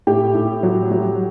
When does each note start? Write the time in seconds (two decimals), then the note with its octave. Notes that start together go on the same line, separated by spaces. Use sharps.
0.07 A2 G4
0.35 A2
0.63 F#3
0.91 F#3